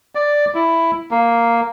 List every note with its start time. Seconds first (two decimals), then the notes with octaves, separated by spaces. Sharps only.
0.15 D5
0.55 E4
1.11 A#3